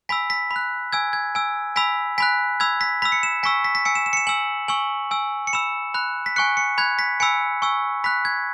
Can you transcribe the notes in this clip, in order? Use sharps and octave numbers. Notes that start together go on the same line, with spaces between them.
G#5 B5 E6 B6
B6
B5
F#6
G#5 E6 G#6
G#6
G#5 E6
G#5 B5 E6 B6
G#5 B5 F#6 B6
B5 E6 G#6
B6
B5 E6 B6
C#7
E7
G#5 C#6 E6 B6
B6
B6
G#5 E6 C#7
E7
E7
C#7
E7
G#5 E6 F#7
G#5 C#6 E6 F#7
G#5 E6
C#7
B5 E6 E7
B5 F#6
B6
G#5 C#6 F#6 C#7
C#7
B5 F#6 G#6
B6
G#5 B5 E6 C#7
G#5 C#6 E6
B5 F#6 B6
G#6